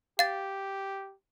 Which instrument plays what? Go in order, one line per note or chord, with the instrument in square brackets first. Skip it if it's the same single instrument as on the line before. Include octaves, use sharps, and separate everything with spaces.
[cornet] G4 [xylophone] F5 A6